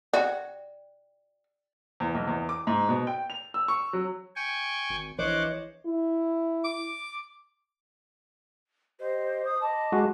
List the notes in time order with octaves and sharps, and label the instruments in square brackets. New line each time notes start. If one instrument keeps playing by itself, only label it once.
[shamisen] F#4 [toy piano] D5 G5
[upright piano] E2
B1
E2
D6
G#2
B2
G5
F7
E6
C#6
F#3
[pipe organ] G5 G#5 C#6
[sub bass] G#1
[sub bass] A#1 [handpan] E3 C#5 D#5 [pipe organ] C5 F#5 D6
[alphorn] E4
[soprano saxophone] D6
[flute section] G4 D#5 [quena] C5
[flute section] D6 D#6
[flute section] D#5 B5 D6 [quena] A5
[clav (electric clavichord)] G#3 F#4